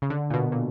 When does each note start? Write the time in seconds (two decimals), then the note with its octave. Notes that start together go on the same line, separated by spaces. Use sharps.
0.02 C#3
0.10 D3
0.30 A#2
0.34 B2
0.52 A#2